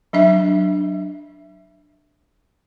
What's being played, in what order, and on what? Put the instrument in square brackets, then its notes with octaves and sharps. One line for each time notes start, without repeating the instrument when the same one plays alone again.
[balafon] F#3 D4 E5